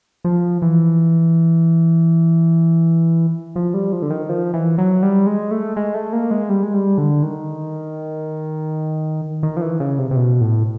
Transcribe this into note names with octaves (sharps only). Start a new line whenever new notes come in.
F3
E3
F3
G3
F3
D3
D#3
F3
E3
F#3
G3
G#3
A3
G#3
A3
A#3
G#3
G3
G#3
G3
D3
D#3
D#3
F3
E3
C#3
C3
C3
B2
A2